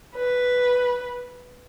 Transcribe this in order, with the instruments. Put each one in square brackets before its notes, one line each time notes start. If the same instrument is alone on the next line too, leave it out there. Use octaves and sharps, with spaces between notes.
[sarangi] B4